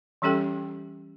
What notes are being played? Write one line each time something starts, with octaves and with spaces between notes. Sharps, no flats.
E3 G3 C#4 G4 A4 G5